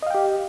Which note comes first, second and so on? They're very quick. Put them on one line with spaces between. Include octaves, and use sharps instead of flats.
D#5 F5 G5 G4